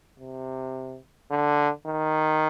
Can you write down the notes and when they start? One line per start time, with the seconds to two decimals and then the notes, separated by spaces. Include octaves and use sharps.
0.20 C3
1.31 D3
1.86 D#3